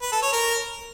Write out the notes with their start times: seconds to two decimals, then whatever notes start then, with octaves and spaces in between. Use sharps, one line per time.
0.02 B4
0.12 A4
0.22 C#5
0.33 A#4